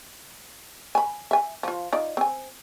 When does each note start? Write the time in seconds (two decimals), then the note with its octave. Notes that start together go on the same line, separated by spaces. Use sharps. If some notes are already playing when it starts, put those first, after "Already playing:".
0.95 G#5 B5
1.31 E5 G#5
1.63 F3 F4
1.93 D#4 F4 D5
2.17 C4 G#5